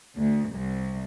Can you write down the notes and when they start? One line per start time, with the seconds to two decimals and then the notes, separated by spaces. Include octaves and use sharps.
0.17 D2
0.54 C2